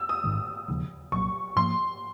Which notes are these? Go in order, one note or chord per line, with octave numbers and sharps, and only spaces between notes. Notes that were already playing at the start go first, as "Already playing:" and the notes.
Already playing: E6
D#6
A1 G#2 D#3 G#3
E1 D#2 C#3 F3
C2 A#2 F#3 C#6
G#2 F3 A#3 C6